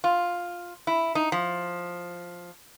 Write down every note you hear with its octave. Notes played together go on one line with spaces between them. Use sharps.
F4
E4
D#4
F3